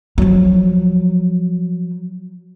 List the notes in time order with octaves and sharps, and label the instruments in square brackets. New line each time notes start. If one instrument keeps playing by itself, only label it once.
[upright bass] F3 F#3